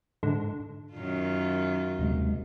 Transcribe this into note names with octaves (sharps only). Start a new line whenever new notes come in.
G#2 D3
F#2 D#3 F4
D#2 C3 G#3